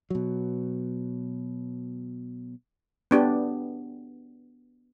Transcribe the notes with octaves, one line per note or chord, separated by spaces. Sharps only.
B2 F#3
B3 D4 G4